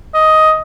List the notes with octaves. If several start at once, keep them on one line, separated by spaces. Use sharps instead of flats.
D#5